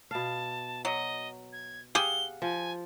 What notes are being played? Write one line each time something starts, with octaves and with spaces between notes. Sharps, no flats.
B2 F5 A5
F#3 D#5
G#6
G4 G#4 F5 F#5 G7
F3 G#5